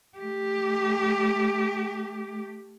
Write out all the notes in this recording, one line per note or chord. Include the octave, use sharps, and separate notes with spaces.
A3 G4